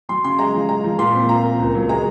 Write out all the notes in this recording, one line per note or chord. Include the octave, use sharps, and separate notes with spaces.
F#3 C6
C#3 C6
G#3 A#5
F3
G#3 A#5
F3
A#2 C6
C4
F4 A#5
A#3
C#2
F#3
G#3 A#5